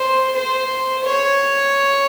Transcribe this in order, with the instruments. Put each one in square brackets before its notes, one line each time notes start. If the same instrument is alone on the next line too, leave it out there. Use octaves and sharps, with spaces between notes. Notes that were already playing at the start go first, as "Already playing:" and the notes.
Already playing: [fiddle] C5
C5
C#5